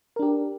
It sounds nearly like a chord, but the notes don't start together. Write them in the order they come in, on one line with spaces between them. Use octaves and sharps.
A#4 D4 G4